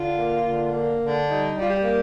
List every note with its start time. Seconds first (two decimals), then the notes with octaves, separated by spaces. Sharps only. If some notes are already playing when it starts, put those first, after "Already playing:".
Already playing: D3 F4
0.19 A#3
0.47 D3
0.73 A#3
1.01 D3
1.28 G3 D#4
1.56 G3 F4
1.68 G4
1.82 A#3